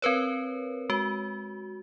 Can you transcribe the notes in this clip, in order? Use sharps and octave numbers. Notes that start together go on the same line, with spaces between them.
C4 A#4 B4 C#5
G#3 F#4